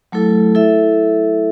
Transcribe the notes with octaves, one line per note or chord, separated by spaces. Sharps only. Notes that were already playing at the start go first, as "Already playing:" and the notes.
F#3 A3 E4 A4
E4 A4 E5